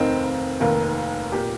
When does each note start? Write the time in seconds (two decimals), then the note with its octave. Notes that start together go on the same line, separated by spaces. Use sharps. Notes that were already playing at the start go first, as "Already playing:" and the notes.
Already playing: F1 D#2 D#3 C4 D#4
0.60 F1 D#2 D#3 A#3
1.32 A#2 A#3 G4